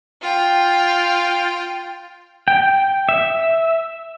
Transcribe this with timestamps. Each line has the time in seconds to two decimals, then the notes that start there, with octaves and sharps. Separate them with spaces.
0.22 F4 G5
2.48 G5
3.09 E5